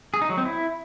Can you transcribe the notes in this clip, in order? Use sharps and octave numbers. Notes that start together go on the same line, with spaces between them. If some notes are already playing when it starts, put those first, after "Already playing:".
G#4
D#4
F#3
C4
E4